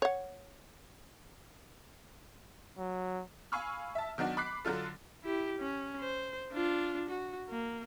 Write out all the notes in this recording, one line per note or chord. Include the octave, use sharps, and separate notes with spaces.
C#5 F#5
F#3
F5 G#5 B5 C#6 E6 F6
E5 A5
D#3 F#3 B3 D4 F#4
B5 D6 F#6 B6 C7
D3 F#3 D4 F4 A4
E4 G4
C#4
C5
D4 F4
F#4
A#3